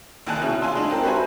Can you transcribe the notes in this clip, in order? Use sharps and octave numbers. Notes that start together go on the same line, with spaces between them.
A#1 D#3 G#5 A5 F#6
B2 C#4 E4 G#4
F4 G#5 A5 C6 E6
G#3 D4 D#4
C4 G4 A#4 A5
F#4 B4 C5 E5 G#5